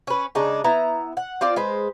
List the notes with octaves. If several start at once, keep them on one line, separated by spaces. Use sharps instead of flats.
C#4 B4
C#3 G#3 D4 D#4
B3 E4 A#5
F#5
C4 F4 D5
G#3 B4 C5